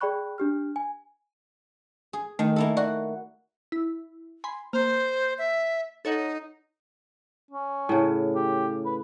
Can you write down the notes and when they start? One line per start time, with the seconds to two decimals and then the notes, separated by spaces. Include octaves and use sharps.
0.01 G#4 D5 G5 B5 C#6 F#6
0.38 D4 G4 F6
0.76 G#5
2.13 G#4
2.39 D#3 A3
2.56 A#3 E4 A4
2.77 F#4 D5
3.72 E4
4.44 G#5 B5 C6
4.73 A#3 C5
5.38 E5
6.05 D#4 A4 C#5 F#5
7.51 C#4
7.89 A2 C#3
8.36 G4
8.85 B4